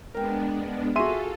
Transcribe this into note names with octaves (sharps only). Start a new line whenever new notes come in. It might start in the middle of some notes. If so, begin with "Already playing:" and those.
G#3 B3 D4 A#4 G5
F4 F#4 G#4 A4 E5 C6 D#7